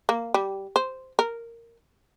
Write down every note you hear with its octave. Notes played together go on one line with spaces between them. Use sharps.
A#3
G3
C5
A#4